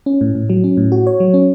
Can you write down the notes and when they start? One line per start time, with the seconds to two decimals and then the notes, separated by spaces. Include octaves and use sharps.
0.06 C#4
0.21 A2
0.35 A2
0.50 F#3
0.64 C#4
0.77 A2
0.92 F#4
1.07 C#5
1.20 F#3
1.34 C#4